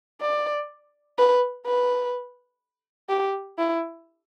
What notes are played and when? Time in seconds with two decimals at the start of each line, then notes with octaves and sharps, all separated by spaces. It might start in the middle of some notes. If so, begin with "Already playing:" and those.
0.21 D5
1.18 B4
1.66 B4
3.09 G4
3.58 E4